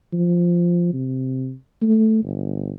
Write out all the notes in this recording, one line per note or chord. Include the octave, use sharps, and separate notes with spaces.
F3
C3
A3
G1